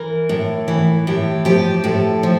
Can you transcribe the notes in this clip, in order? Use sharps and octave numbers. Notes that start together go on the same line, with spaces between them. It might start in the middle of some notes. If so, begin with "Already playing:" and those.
Already playing: E3 A#4
A2
E3
A2 G4
F3 G4
A2 A4
F3